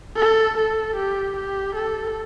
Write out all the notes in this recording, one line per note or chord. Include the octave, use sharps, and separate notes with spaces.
A4
A4
G4
G4
A4